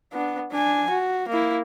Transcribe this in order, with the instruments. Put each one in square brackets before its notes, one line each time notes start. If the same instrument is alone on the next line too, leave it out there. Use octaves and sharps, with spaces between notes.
[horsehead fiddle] B3 D4
D4 G#5
F#4
A#3 E4